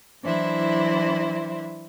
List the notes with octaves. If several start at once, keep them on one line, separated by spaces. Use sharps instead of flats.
E3 F#3 D4 E4 C5